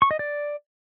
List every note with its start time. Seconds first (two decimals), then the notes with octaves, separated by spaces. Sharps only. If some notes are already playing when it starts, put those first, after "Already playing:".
0.02 C#6
0.11 D#5
0.19 D5